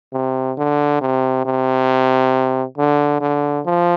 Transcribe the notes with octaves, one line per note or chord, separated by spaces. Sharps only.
C3
D3
C3
C3
D3
D3
F3